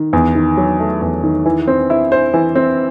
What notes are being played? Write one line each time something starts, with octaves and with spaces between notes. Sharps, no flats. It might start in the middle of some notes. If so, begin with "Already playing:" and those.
Already playing: D#3
E2
D#3
F#3
A3
E2
D#3
E3
C4
E4
C5
E3
C4